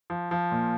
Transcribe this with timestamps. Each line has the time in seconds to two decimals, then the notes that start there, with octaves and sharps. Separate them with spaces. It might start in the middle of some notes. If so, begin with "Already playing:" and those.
0.10 F3
0.31 F3
0.52 A#2